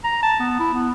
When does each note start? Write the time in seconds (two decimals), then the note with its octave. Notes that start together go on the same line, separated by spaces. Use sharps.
0.04 A#5
0.23 A5
0.40 B3
0.60 E4
0.74 B3